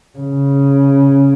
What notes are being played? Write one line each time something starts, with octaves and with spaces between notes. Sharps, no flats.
C#3